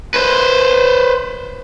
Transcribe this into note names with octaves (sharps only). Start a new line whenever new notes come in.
B4 C5